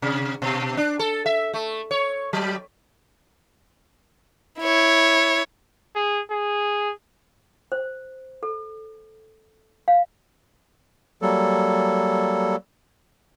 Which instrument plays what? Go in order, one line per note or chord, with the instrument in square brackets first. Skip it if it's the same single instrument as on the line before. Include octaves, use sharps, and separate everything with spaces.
[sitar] C3
B2
D4
A4
E5
A3
C#5
F#3
[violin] E4 C#5
[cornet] G#4
G#4
[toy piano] C5
A4
F5
[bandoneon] F#3 G3 A#3 A4